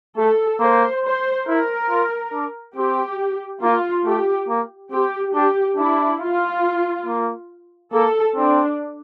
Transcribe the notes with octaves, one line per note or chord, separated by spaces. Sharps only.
A3 A4
A#3 C5
C5
E4 A#4
F4
D4
C4 G4
A#3 F4
A3 G4
A#3
C4 G4
D4 G4
D4 E4
F4
A#3
A#3 A4
C4 D4